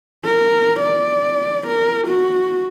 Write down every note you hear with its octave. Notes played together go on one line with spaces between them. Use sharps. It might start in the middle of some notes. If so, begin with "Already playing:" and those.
A#4
D5
A#4
F#4